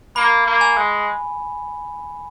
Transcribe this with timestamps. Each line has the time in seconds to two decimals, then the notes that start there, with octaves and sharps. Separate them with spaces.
0.16 A#3 B5
0.46 A#3
0.61 G#5
0.77 G#3